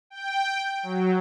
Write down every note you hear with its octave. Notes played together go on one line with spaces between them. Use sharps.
G5
F#3